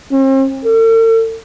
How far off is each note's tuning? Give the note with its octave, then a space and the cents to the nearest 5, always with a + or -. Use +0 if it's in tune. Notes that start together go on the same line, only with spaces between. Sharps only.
C4 +45
A4 +45